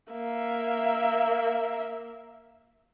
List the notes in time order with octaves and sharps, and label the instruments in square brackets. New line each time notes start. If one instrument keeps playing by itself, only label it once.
[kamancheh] A#3 E5